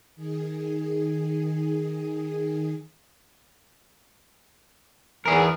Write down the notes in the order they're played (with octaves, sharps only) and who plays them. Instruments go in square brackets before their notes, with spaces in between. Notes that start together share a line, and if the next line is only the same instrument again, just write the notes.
[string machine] D#3 G#4
[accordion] E2 E3 [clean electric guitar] G#4 A#4